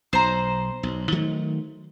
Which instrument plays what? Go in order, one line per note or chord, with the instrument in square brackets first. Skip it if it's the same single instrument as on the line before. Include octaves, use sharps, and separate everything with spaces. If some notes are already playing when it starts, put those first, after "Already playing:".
[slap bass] B1 [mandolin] C5 A#5
[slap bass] B1
D#3 F#3 A3